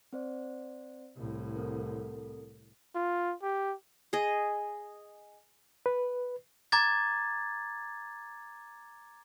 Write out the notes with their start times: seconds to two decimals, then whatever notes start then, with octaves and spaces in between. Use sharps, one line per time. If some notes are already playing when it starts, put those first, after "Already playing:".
0.13 C4 C5 D5
1.17 C2 A2
1.56 C4 A4 A#4
2.95 F4
3.43 G4
4.13 G#4 D#5
5.86 B4
6.72 A#5 D6 G#6 A6